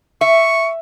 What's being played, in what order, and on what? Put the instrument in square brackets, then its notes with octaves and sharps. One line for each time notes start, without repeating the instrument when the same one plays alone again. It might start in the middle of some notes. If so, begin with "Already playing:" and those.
[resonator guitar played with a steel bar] E5 [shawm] C#6